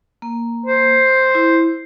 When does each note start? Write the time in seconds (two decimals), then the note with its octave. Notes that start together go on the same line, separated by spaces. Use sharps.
0.22 A#3
0.66 C5
1.35 E4